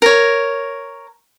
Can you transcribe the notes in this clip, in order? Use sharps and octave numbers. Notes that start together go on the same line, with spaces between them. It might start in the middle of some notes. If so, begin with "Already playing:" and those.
A#4 C#5